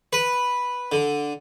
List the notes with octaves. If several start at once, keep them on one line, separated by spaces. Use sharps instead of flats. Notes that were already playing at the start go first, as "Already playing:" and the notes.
B4
D3